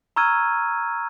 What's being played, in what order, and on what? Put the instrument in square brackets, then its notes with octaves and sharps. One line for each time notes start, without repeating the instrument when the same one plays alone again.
[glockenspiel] A#5 C#6 E6 F6 G#6 D#7